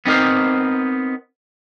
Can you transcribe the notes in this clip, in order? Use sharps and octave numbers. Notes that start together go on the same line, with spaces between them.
B3 C4 D#4 A#4 C5